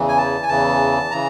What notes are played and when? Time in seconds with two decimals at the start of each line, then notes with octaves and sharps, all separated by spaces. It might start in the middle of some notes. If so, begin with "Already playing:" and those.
Already playing: E2 C#3 E3
0.08 G#5
0.18 A5
0.43 G#5
0.49 E2 C#3 E3 A5
1.11 C#3 E3 A#5